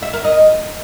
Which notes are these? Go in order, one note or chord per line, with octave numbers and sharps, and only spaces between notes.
E5
A#4
D#5